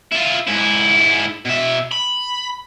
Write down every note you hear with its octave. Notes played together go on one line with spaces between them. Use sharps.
E4 F4
G#2 E4
B2 E5
B5